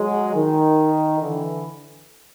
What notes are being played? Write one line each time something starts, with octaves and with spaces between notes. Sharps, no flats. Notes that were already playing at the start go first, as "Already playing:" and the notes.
Already playing: F#3 G#3
D#3
D3 E3